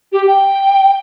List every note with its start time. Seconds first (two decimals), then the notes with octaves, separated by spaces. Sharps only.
0.12 G4
0.27 G5